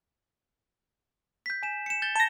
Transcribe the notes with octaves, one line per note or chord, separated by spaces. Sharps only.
G6 B6
G#5 E7
C#7 E7
G6 A6 G7
A5 A#6 E7